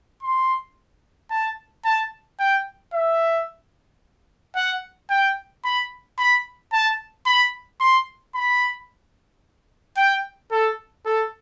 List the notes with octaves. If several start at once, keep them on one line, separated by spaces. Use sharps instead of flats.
C6
A5
A5
G5
E5
F#5
G5
B5
B5
A5
B5
C6
B5
G5
A4
A4